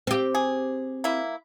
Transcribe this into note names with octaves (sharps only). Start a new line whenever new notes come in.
C4 G4
G#4
A#3 E4